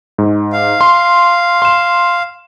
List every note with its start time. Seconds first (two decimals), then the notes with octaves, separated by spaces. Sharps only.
0.18 G#2
0.52 F5
0.81 C6
1.62 C6 E7